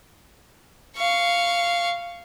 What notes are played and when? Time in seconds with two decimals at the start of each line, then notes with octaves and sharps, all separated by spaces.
0.97 F5 C#6